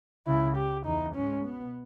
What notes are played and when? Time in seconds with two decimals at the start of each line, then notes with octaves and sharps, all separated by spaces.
0.27 C#2 C#3 E4
0.57 G4
0.85 E2 E3 D#4
1.14 G#2 G#3 C#4
1.44 B2 B3